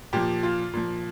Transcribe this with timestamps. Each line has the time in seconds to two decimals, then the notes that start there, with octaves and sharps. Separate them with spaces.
0.13 A#2 F3 G4
0.43 F4
0.73 A#2 F3